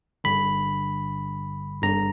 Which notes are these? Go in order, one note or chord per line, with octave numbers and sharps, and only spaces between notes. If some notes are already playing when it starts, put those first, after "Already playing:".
G1 G2 D3 B5
G1 G2 D3 A#5